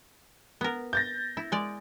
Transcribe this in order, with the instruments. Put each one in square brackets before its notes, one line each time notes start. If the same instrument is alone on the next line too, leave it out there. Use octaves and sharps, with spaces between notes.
[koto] B3 A#4
[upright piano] G6 A6 A#6
[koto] E4
G#3 D5